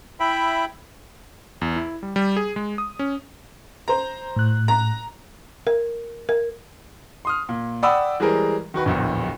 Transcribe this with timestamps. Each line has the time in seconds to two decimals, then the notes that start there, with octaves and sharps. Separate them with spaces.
0.20 E4 E5 G5 B5
1.61 E2
1.76 E4
2.03 G3
2.16 G3
2.37 G#4
2.56 G#3
2.78 D#6
2.99 C#4
3.88 C5 A#5
4.36 A2 F#6
4.68 A#5
5.67 A#4
6.29 A#4
7.25 C6 D#6 F6
7.49 A#2
7.83 D5 F#5 G5 B5 D#6 E6
8.20 E3 G3 G#3 G#4 A#4 C5
8.74 D#3 F#4 B4
8.86 D1 A#1 E2